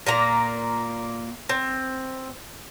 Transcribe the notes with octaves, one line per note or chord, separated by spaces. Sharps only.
A#2 A#3 A#5
C4